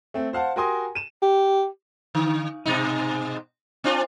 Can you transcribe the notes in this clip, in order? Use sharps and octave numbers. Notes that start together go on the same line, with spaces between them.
A3 C4
C5 F5 F#5 A5
F#4 G4 A#4 G#5 C6 D#6
D#7 E7
G4
D3
G#2 B2 D#4
C4 D4 F4